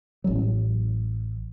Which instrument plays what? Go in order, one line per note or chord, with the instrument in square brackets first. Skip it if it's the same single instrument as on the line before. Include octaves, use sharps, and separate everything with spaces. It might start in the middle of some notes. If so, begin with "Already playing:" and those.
[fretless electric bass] A1 F#3